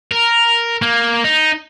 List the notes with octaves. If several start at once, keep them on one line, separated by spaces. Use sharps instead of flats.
A#4
A#3
D#4